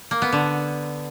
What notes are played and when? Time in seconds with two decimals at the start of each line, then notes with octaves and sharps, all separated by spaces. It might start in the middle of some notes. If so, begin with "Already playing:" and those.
0.11 A#3
0.22 B3
0.33 D3